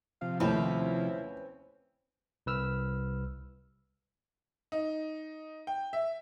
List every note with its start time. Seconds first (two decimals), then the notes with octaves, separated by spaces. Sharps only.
0.22 C3 F3 F5
0.40 D#2 A2 C4 C#4 E4 B4
2.46 C2 B4 E6 F6
4.72 D#4
5.67 G5
5.93 E5